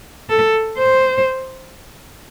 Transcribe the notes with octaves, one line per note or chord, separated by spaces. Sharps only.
A4
C5